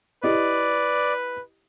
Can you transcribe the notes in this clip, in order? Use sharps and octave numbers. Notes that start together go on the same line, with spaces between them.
E4 G4 B4 D5 D#5